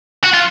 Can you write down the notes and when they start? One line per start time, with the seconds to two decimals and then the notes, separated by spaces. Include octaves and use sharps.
0.24 F#4
0.34 F4